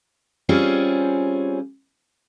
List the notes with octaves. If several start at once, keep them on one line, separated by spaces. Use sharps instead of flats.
G3 C4 C#4 F4 G#4